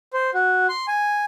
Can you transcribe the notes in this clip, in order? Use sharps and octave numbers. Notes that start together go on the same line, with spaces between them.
C5
F#4
C6
G#5